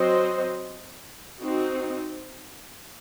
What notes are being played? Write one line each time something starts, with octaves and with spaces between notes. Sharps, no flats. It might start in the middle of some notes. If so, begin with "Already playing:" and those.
Already playing: F#3 C4 F#4 C5 D#5
C4 D#4 F#4